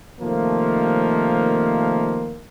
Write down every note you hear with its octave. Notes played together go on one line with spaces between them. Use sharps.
C3 D#3 F3 A3 A#3